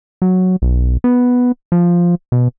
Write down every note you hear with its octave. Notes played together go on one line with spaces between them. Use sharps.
F#3
B1
B3
F3
B2